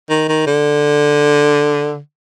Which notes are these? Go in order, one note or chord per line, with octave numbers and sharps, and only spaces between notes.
D#3
D#3
D3